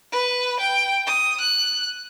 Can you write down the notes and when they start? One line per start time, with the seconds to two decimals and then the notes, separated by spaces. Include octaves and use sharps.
0.11 B4
0.59 G5
1.06 D#6
1.40 F#6